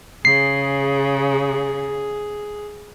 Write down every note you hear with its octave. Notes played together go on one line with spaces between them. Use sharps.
C#3 G#4 C7